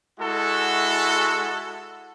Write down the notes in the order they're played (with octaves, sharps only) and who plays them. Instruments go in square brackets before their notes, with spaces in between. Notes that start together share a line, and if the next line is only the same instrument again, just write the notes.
[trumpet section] G#3 E4 F#4 A4